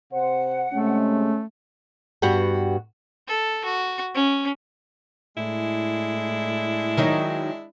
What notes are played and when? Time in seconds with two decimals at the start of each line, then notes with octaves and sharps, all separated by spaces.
0.12 C3 C5 F#5
0.73 C3 G#3 A3 C#4
2.22 G2 B3 F#4 G4 F#5
3.28 A4
3.65 F#4
4.14 C#4
5.37 A2 G#3 D4 E4
6.97 D#3 F#3 D#4